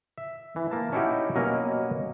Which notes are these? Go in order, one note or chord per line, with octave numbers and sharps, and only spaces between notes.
E5
E3
A#3 A5
C#4 D#4 E4 F#4 G4 F#5
B2 F#3 A#3 C#4 A#4 D#5